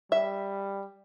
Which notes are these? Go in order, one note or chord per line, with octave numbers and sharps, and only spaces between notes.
G3 E5